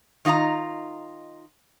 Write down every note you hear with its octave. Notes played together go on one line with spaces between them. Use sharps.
D#3 D#4 F4 E5 A#5